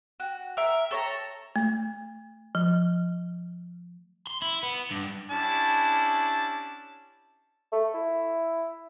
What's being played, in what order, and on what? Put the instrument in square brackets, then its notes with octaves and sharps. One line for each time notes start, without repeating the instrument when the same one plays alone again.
[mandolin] F#4
A#4 E5
A4 C#5 A#5
[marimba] A3
F3
[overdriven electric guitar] C6
E4
B3
G2
[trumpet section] C#4 D4 E4 G4 A5
[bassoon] A3
E4